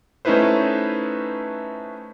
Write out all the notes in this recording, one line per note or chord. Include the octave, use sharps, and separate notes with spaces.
A3 C#4 D#4 E4 B4 C5